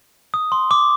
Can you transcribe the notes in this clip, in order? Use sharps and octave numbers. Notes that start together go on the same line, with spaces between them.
D#6
C6
D6